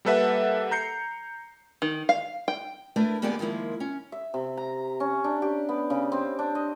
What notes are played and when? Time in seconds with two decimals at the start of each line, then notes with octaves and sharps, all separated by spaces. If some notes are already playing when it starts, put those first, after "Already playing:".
0.05 G3 A#3 A4 B4 E5 F#5
0.71 A#5 G6 C7 C#7
1.82 D#3
2.09 F5
2.48 G5
2.96 A3 D4 E4 A#4 B4
3.22 D#2 A#3 B3 G4 G#4 D5
3.39 D#3 F3 G#3 A#3 E4
3.80 C#4
4.12 E5
4.34 C3
4.57 A#5
5.00 C#4
5.24 D4
5.42 G4
5.69 B3
5.90 C#3
6.12 C4
6.39 D4
6.55 D#5